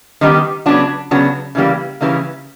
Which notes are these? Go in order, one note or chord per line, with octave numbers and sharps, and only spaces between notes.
D#3 G3 B3 D#4 G4
C#3 F#3 B3 D4 F#4
C#3 F#3 B3 D4 F#4
C#3 E3 G3 A#3
C#3 E3 G3 A#3